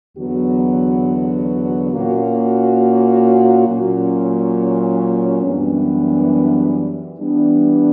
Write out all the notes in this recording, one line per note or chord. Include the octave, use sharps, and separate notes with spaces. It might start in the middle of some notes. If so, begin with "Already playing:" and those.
E2 D3 F#3 B3 F#4
A#2 A#3 C#4 F#4
A#2 F#3 C#4
F#2 E3 G3 B3 D4
E3 G3 B3 D4